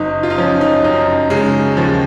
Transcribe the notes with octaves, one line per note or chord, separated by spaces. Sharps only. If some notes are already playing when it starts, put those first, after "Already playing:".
Already playing: F#1 D#4
F4
D#4
F3 C#4
D#4
F#2 D#4
C#3 G#3
D#2 F3